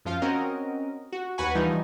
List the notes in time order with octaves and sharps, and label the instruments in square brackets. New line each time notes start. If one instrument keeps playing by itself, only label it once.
[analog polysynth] F#2 F3 F4 F5
C4 C#4 F#4 A#4 D#5
F#4
D#2 F#4 B4 F#5 G#5 C#6
E3 F3 G3 D#4